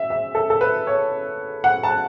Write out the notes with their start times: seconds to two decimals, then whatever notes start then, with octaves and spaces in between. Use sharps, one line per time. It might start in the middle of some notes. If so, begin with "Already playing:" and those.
Already playing: E5
0.10 E5
0.35 A4
0.50 A4
0.61 B4
0.87 C#5
1.64 F#5
1.83 A5